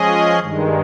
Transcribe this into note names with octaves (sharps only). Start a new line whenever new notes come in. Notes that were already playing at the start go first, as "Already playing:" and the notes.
Already playing: F3 G#3 C#4 G#4 D#5
G2 D#3 G#3